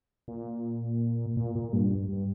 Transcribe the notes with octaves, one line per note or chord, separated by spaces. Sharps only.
A#2
A#2
A#2
G2
G2
G2